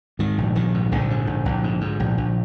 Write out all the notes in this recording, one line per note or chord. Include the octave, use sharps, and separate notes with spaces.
G#2 D#3
A#1
A#1 D#3
G#2
A#1 D3
G#2
A#1
A#1
G#2
G#2
A#1
A#1